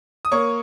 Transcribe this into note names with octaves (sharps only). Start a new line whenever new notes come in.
D#6
A#3 C#5 C#6